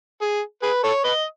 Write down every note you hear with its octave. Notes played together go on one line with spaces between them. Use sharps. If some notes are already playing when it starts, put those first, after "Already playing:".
G#4
G#4 B4
A4 C#5
B4 D#5